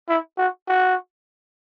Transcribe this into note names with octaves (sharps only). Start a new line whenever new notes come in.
E4
F#4
F#4